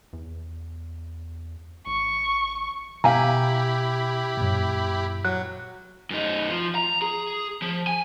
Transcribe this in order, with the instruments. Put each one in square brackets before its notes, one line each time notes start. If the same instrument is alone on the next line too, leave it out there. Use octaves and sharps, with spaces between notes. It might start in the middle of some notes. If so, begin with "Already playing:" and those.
[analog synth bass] E2
[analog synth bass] A1 [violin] C#6
[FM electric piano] B2 [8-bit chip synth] E4 G4 B5 [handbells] F5 G#5 A#5
[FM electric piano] F#2 A#2
[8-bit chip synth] F#3 [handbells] F#6
[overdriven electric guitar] F#2 D#4
F3
A#5
G#4
F3
G#5